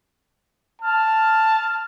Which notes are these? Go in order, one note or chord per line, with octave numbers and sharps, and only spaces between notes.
A5 F6